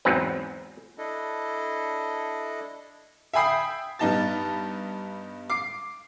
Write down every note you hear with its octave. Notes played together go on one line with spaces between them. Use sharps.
E2 G#2 F#3 C4 B4
D4 E4 A4 D#5
E5 G5 G#5 B5 D#6 C7
G2 B3 D#4 A5 A6
D6 C7